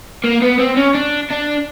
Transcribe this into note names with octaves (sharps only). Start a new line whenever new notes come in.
A#3
B3
C4
C#4
D4
D4